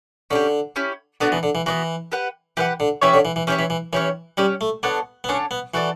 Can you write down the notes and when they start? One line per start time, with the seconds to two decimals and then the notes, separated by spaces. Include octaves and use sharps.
0.30 D3 C#4 E4
0.35 G4
0.76 C#4 E4 G4
1.21 D3 B3 D4 F#4
1.32 E3
1.43 D3
1.55 E3
1.66 E3 B3 D4 F#4
2.12 G4 B4 F#5
2.57 E3 G4 B4 F#5
2.80 D3
3.01 E3 C#4 G4 C#5 E5
3.14 D3
3.25 E3
3.36 E3
3.47 E3 C#4 G4 C#5 E5
3.59 E3
3.70 E3
3.93 E3 C#4 G4 C#5
4.37 G3 C#4 G4 C#5
4.61 A3
4.83 B3 D4 A4 C#5 F#5
5.24 B3
5.29 C#4 D4 A4 C#5 F#5
5.51 B3
5.74 E3 F#4 A4 D5